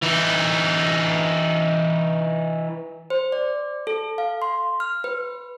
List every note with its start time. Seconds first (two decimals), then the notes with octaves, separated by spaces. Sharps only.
0.02 E3 D#4
3.10 C5
3.32 D5
3.87 A4
4.18 F5
4.42 C6
4.80 F6
5.04 B4